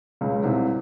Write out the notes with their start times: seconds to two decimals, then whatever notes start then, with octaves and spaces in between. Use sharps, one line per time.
0.21 C#2 C#3
0.44 C2 C3